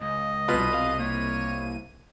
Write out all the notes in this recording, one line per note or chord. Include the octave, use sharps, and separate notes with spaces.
C#2 D#5
C2 B2 F4 B4 D#7
F5
A#3 C#5